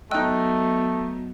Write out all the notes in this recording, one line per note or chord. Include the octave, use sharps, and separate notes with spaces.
F#3 A3 B3 D#4 D#5 G5 E6 F#6